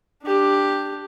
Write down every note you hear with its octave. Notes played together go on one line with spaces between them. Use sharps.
D4 G4